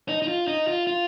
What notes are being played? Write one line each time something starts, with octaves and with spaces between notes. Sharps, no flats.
D#4
D#4
F4
D#4
F4
F4